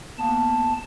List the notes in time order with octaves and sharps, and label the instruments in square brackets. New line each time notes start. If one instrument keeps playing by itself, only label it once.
[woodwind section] A#3 B3 [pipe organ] A5